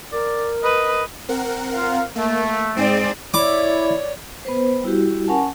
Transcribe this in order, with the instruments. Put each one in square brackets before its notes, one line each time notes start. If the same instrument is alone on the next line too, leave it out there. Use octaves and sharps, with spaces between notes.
[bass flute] A#4 [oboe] D5
[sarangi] B4 [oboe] D#5
[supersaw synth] C4 A#4 F#5
[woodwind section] F4 F5
[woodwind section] A3 [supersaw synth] A#3
[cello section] G#2 C4 D5 [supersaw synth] D#4 G#4 D#7
[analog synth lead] E4 [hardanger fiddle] C#5 [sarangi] D5 [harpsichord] D6
[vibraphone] B3 B4 C5
G3 E4 F#4 G4
C#4 A#4 F#5 G#5 A5